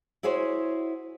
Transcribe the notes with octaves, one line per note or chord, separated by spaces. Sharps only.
E4 F#4 G#4 C5 C#5